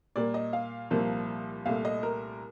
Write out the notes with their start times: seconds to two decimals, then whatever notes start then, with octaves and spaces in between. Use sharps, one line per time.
0.16 A#2 G3 A#3 D5
0.34 D#5
0.53 F5
0.90 C2 A#2 F3 A#3
1.66 C2 A#2 A3 F5
1.85 D#5
2.03 A#4